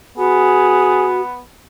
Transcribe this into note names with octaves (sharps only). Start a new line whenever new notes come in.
B3 F#4 G#4